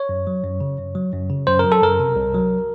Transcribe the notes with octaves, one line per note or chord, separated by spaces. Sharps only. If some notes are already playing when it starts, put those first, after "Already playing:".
Already playing: C#5
F#2
F#3
F#2
C#3
F#2
F#3
F#2
C#3
F#2 C5
F#3 A#4
A4
F#2 A#4
C3
C2
F#3